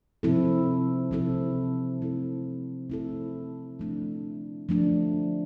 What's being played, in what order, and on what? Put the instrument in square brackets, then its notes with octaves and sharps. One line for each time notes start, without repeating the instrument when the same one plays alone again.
[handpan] C3 F3 C4 E4 A4
C3 F3 C4 E4 A4
A3 C4 E4 A4
A3 C4 E4 A4
F3 A3 D4
F3 A3 D4